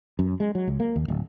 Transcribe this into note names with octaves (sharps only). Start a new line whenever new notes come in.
F#2
G#3
F#3
C#2
A#3
D#2
D1